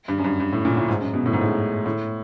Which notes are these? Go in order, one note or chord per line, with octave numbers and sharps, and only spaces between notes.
G2
F#2
G2
G2
A2
A#2
A2
G#2
F#2
B2
A2
G#2
A2
A2